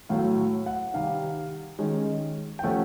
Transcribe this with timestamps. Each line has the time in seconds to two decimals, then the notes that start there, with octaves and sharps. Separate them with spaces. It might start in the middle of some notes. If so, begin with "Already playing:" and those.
0.09 A2 F#3 A3 F5
0.66 F#5
0.94 C3 D#3 G3 F5
1.79 D#3 G#3 C#4
2.59 G5
2.63 C3 F3 A3 C#4 F#5